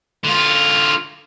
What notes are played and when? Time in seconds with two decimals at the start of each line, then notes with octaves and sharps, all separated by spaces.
0.24 D3 F4